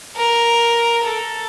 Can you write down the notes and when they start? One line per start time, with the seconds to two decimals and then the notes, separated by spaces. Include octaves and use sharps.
0.16 A#4
1.03 A4